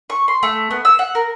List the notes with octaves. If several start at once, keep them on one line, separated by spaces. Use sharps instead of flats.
C#6
C6
A3
B3
E6
F#5
A#4